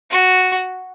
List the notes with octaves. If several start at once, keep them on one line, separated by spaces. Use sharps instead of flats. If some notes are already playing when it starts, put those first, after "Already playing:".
F#4